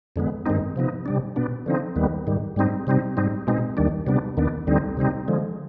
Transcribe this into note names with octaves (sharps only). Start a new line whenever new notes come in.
F2 D3 G#3 B3
G2 D#3 G#3 C4 D#4
C3 F3 B3 D#4
C3 G3 D4
B2 B3 D4
D3 F3 C4 D#4
D#2 D#3 G3 B3
G#2 D#3 G3
G#2 G3 C4 D#4
C3 G3 C4 D#4
G#2 G3 C4 D#4
B2 G#3 C4 D#4
D#2 D#3 G3 D4
C3 G3 B3 D4
D#2 D#3 B3 D4
D2 D3 G3 C4 D#4
C3 G3 C4 D#4
D3 F3 G#3